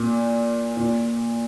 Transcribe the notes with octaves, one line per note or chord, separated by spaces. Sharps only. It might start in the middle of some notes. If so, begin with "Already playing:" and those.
Already playing: A#2
A#2